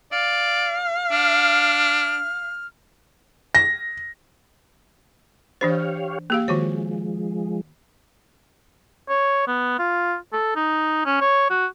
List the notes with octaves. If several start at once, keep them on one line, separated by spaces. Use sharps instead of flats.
D5 F5
D4 F6
A#6
E3 D4 G4 C5 C#5 F5
A#3 G4 G#4 F5
D#3 F3 G#3 F#4 C#5
C#5
B3
F4
A4
D#4
C#4
C#5
F#4